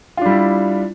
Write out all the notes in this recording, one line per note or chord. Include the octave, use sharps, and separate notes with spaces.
G3 D4 E4 F4